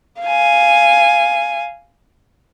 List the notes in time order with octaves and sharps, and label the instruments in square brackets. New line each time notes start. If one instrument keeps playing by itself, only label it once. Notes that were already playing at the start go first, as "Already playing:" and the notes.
[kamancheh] F5 G#5